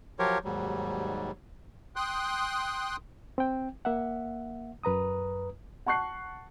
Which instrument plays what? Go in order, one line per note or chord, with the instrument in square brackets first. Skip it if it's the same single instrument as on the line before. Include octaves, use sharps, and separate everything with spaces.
[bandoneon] F3 F#3 F4 G4 A#4 C#5
D#2 G#2 F#3 G3
[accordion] G5 C6 D#6 F#6
[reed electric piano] C4 G5
A#3 E5 F#5
F#2 B4 A#5 D#6
[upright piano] F#5 A5 C#6 F#6 C7